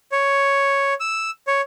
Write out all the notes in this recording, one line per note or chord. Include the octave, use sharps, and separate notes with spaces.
C#5
E6
C#5